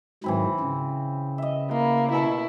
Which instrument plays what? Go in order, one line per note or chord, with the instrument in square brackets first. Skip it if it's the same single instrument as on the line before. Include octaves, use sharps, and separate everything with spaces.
[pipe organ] G#2 D#3 F#3 [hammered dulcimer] E3 C4 B5
[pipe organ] C#3
[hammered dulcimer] D#5 E5
[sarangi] A#3 [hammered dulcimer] E4
[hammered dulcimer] B2 A4 C#6 [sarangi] E4